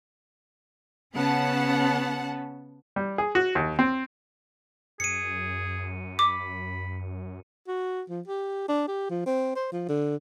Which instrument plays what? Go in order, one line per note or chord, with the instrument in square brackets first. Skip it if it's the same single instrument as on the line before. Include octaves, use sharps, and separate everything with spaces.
[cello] C#3 C#4 [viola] B3 [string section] F#5 A5
[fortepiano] G3
G#4
F#4
D#2
C4
[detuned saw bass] F#2 [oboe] G#4 [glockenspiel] C#7 D#7
[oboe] B5 [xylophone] D6
[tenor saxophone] F#4
F3
G4
D4
G4
F3
C4
C5
F3
D3